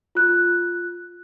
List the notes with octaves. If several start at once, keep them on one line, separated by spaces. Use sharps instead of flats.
F4 F#6